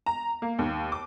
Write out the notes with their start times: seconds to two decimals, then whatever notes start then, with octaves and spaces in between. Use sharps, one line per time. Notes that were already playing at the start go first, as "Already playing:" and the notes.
0.06 A#5
0.42 A#3
0.59 D#2
0.92 D6